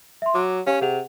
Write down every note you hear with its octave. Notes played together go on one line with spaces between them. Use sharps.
E5 C6
F#3 D6
C#4 G4 F5
C3 G#4 F#5 F7